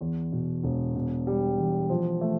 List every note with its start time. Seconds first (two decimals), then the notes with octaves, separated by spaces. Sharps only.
0.01 E2
0.32 B2
0.63 E1
0.95 B2
1.27 G3
1.58 E2
1.90 F3
2.21 A3